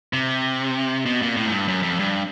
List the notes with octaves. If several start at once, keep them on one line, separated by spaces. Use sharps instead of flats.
C3
B2
A#2
A2
G#2
G2
F#2
F2
G2